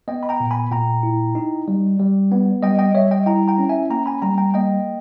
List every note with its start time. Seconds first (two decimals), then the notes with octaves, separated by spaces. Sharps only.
0.08 B3 D#5 G5
0.23 B5
0.29 G5 A#5
0.40 A#2
0.51 G#5 B5
0.71 A#2 G5 A#5
1.03 E4
1.35 D#4
1.68 G3
1.99 G3
2.32 B3
2.63 G3 D#5 G5
2.79 D#5 G5
2.95 G3 C#5 E5
3.11 D#5 G5
3.26 E4 G5 A#5
3.48 G5 A#5
3.58 C#4
3.69 E5 G#5
3.90 A#3 G5 A#5
4.06 G#5 B5
4.22 G3 G5 A#5
4.38 G5 A#5
4.54 A#3 D#5 G5